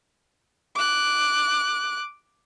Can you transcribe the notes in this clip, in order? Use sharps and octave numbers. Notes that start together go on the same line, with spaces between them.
D6 F#6